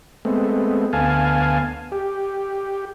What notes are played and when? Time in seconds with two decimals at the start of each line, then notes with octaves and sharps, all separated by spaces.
0.25 G#3 A3 B3 C4
0.93 D2 B3 F5 G#5 A5
1.92 G4